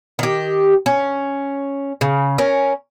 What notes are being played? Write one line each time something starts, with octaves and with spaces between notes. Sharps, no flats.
D#3 G4
C#4
C#3
C#4 A#4